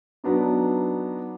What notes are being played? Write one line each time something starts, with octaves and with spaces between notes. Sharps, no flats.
F#3 B3 D4 D#4